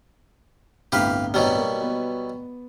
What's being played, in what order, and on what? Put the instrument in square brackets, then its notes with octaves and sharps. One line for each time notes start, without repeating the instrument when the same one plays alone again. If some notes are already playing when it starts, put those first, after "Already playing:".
[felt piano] G1 C2 A2 [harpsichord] G4 B4 F5
[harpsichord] B2 F#3 G3
[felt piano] A#3
B3